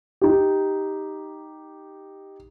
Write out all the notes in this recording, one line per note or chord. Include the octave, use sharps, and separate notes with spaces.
D#4 G4